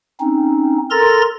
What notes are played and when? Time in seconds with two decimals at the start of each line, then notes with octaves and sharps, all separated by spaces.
0.20 C4 C#4 D#4
0.91 A4 A#4 A#5 C6 A6 A#6